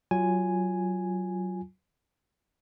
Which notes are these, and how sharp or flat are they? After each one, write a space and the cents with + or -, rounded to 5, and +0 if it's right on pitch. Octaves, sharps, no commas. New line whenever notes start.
F#3 +15 F4 +0 G#5 +0